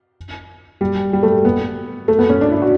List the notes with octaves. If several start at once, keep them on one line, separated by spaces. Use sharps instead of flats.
G3
G3
A3
B3
A3
B3
C#4
D4
E4
F#4